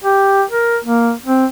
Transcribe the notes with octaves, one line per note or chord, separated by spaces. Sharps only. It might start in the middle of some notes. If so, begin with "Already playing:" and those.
G4
A#4
A#3
C4